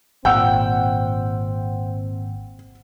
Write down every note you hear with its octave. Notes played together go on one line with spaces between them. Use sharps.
G#1 A#2 C4 F#5 G5 E6